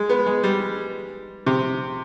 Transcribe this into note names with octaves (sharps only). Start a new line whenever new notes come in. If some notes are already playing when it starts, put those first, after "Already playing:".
Already playing: G#3
B3
G#3
G3
C3